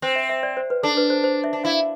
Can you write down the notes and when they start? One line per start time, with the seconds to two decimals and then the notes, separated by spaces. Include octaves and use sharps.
0.02 C4 C5
0.16 E5
0.29 E5
0.43 D5
0.57 C5
0.70 B4
0.83 D4 A4
0.97 B4
1.10 C5
1.24 C5
1.44 E5
1.53 D4
1.64 E4 F5